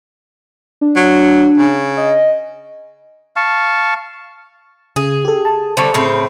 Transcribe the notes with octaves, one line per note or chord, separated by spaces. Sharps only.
D4
F#3
C#3
D#5
F5 A5 C#6
C#3 G#4
G4 A4
A5
D3 G3 C4 C5 A5 C#6
A2 C#3 C4